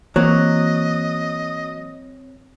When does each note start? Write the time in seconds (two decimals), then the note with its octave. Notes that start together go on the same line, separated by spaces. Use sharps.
0.16 E3 F#3 A#3 C4 C#5 D#5 F#6